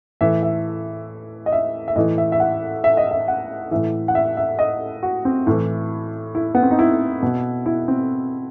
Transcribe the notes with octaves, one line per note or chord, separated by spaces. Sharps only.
A2 E3 E5
E5
D#5
E5
E5
A2 E3 D#5
E5
E5
F#5
E5
D#5
E5
F#5
A2 E3 E5
F#5
E5
E5
D#5
F#4
C4
A2 E3 E4
E4
B3
C4
D#4
E4
B2
E4
C4